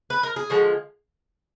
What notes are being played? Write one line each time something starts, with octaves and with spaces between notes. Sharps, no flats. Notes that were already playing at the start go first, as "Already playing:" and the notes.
B4
A#4
G#4
D3 F3 G#3 F#4